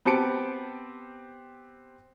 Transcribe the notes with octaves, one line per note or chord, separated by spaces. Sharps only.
B3 C4 G4 A5 C#7 D7